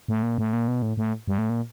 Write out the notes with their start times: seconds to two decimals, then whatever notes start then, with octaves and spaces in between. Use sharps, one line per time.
0.08 A2
0.23 A#2
0.38 A2
0.53 A#2
0.68 B2
0.82 A2
0.97 A2
1.28 G2
1.38 A2
1.50 A#2